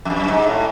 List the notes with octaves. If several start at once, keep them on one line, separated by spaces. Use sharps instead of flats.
F2
F#2
G2
G#2
A2